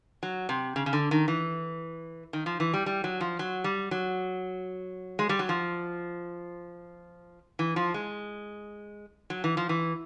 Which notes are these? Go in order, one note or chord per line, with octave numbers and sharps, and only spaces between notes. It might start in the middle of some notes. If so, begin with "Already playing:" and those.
F#3
C3
C#3
C#3
D3
D#3
E3
D#3
F3
E3
G3
G3
F#3
F3
F#3
G3
F#3
G#3
G3
F#3
F3
E3
F3
G#3
F#3
E3
F3
E3